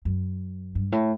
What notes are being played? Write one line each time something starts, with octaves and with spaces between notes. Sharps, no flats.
F#2
G2
A2